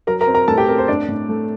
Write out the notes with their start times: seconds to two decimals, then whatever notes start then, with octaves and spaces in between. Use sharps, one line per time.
0.07 F#3 A#4 A#5
0.21 A#4 A#5
0.27 C4
0.34 A#4 A#5
0.48 A2 A4 A5
0.58 G4 G5
0.67 C4 A#4
0.78 C5
0.88 A2 D4 D5
1.08 A2
1.29 A3